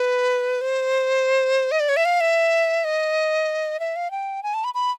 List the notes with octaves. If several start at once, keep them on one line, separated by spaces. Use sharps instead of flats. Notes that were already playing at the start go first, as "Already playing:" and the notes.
Already playing: B4
C5
D#5
D5
C#5
E5
F5
E5
D#5
E5
F5
G5
G#5
A5
B5
B5